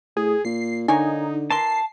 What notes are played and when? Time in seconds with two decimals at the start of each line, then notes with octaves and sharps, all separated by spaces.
0.17 A2 G#4
0.45 A#2 C7
0.88 D3 A#3 D#4 C#5 G#5
1.51 E3 A#4 A5 C6 C7